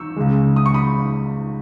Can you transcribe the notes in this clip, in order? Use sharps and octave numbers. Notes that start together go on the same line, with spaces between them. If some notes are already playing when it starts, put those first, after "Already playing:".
Already playing: C#6 E6
C#2 C#3 G#3
D#6
C#6
B5 D#6